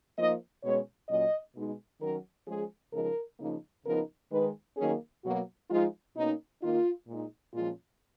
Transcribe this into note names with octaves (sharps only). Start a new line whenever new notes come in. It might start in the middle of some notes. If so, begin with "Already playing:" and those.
F3 A#3 D#4 D#5
B2 G#3 C#4 C#5
A#2 F#3 C#4 D#5
B2 G#3 D#4
D#3 F#3 C#4 A#4
F3 G#3 C#4 G#4
C#3 F3 G#3 D#4 A#4
C#3 F3 A#3 D#4
C#3 F3 B3 D#4 A#4
D#3 G#3 D#4 B4
D#3 F#3 A#3 C#4 G#4
B2 F#3 A#3 F#4
F3 G#3 D#4 F4
B2 A#3 C#4 D#4
D#3 A#3 D#4 F4
A#2 G#3 D#4
A#2 F3 G#3 C#4 F4